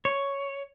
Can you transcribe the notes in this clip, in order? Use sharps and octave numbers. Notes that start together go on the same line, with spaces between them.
C#5